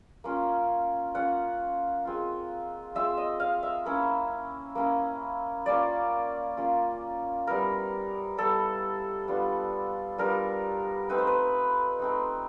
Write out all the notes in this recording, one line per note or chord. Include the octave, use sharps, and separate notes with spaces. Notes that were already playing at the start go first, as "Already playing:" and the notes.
A#3 C#4 F4
A#3 C#4 F4 F#5
G#3 C4 F4
G#3 C4 F4 E5
D#5
F5
E5
A#3 C#4 E4
A#3 C#4 E4
A#3 C#4 F4 D5
A#3 C#4 F4
G3 B3 E4 A#4
G3 B3 E4 A4
G3 B3 D4 F4
G3 B3 D4 F4 A#4
A3 C4 D#4 B4
C5
B4
A3 C4 D#4